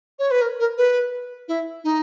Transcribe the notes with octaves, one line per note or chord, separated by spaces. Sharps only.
C#5
B4
A#4
A#4
B4
E4
D#4